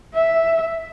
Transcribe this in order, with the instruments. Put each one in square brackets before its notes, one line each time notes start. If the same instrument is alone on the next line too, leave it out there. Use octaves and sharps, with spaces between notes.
[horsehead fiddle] E5